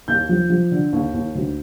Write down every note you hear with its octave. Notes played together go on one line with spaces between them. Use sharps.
D#2 G6
F3
F3
D3
D#2
D#2
D2